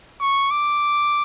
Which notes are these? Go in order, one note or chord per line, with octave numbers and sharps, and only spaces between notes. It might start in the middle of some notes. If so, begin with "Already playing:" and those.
C#6
D6